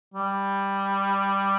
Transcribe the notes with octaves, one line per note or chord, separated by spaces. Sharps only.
G3